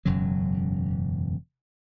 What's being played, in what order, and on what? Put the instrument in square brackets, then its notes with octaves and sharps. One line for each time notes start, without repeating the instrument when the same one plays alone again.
[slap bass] E1 F#2 C#3 F#3